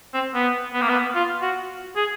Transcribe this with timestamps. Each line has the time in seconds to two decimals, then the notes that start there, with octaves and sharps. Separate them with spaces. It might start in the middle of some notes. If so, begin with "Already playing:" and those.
0.14 C4
0.34 B3
0.74 B3
0.81 A#3
0.89 B3
1.15 F4
1.42 F#4
1.96 G#4